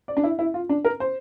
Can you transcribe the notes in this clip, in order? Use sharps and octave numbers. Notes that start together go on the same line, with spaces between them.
D5
D4
E4
E4
F4
D4
A#4
C5